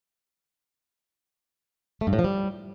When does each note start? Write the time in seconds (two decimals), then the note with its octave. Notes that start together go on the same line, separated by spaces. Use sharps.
2.01 A3
2.07 G2
2.13 A2
2.19 F3
2.24 G3